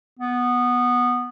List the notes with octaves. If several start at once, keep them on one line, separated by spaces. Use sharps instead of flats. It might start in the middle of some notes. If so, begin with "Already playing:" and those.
B3